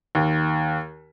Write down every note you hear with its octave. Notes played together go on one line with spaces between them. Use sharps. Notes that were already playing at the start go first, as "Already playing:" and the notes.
D#2